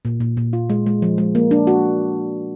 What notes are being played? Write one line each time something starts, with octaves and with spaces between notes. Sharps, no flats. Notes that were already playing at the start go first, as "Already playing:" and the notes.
A#2
A#2
A#2
F4
G#3
G#3
F3
G#3
A#3
D4
F#4